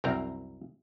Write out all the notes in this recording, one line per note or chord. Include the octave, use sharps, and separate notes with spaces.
C2 F#2 C4 A#4 A#5